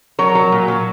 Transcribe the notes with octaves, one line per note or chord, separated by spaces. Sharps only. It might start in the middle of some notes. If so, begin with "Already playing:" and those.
F#3 A#4 C#5
F#3
A#2
F#3